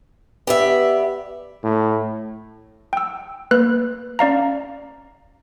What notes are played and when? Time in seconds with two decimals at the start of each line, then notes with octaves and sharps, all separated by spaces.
0.47 B3 G4 D5 E5
1.63 A2
2.93 G5 E6
3.51 A#3 B4 F#6
4.19 C#4 D5 F5 A#5